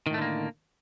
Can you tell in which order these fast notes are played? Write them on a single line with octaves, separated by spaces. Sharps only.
D#3 A2 A3 D3 A#3